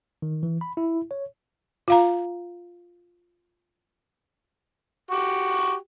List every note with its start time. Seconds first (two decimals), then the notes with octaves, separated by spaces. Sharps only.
0.22 D#3
0.43 E3
0.61 B5
0.77 E4
1.11 C#5
1.88 F4 F5 A#5
5.11 F#4 G4